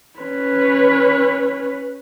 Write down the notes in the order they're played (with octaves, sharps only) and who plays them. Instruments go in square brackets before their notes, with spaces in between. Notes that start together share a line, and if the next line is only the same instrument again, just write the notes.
[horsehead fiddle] C#4 B4